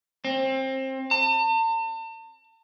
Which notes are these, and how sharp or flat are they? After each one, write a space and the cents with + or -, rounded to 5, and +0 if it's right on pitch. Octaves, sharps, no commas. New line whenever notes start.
C4 +25
A5 +40